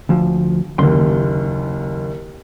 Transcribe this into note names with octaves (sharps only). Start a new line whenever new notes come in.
D2 F3
F#1 D#2 C6